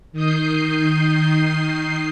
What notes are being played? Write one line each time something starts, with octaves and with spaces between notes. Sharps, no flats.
D#3 D#6 G6 C7